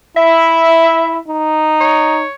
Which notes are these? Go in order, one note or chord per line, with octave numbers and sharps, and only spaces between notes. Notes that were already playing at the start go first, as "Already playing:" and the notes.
E4 E5
D#4
C#5